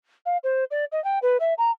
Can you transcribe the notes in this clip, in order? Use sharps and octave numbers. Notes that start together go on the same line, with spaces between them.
F5
C5
D5
D#5
G5
B4
E5
A#5